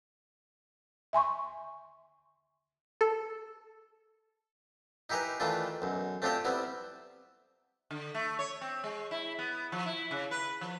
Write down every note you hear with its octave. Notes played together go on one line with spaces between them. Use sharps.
E5 G#5 C6 C#6
A4
D#4 E4 G4 G#4 A#4 B4
D#3 E3 A3 D4 E4 F4
B1 F#2
A3 C4 D4 F4 G4 C5
C3 G3 B3 E4
D3
A3
C#5
C4
G#3
E4
B3
F3
E4
C#3
B4
F3